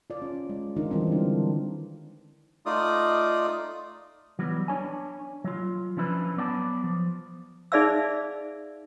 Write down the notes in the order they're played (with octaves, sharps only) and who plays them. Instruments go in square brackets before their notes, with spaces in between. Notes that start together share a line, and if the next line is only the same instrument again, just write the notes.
[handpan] F4 D5
C#4
G#3
D#3 D4 D#4 F4 A#4
D#3 E3 G3 G#3 C4 D#4
D3 D4
[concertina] A3 D#4 F4 D5 D#6
[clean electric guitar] E3 F#3 G3 B3
D4 C#5 G#5
F#3 F4
F3 C#4 D4 E4 B4
F#3 B3 D5 F#5 A5
F3
[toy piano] D#4 G#4 D5 E5 F5 E6